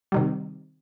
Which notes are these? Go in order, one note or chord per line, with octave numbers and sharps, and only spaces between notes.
C3 D#3 G3